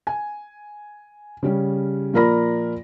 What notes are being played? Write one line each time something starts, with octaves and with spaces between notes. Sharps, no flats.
G#5
C#3 G3 C#4
A#2 F3 A#4 D5 B5 A#6